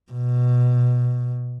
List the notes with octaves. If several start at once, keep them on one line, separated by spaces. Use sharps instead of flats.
B2